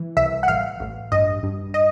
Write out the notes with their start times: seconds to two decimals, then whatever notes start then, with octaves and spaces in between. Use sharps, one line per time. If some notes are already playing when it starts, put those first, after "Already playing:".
Already playing: E3
0.17 C2 E5
0.43 F#5
0.48 A1 F5
0.80 A1
1.12 G2 D#5
1.43 G2
1.74 D#5